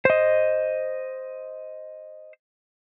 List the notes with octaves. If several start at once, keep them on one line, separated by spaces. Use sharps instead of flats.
C5 D#5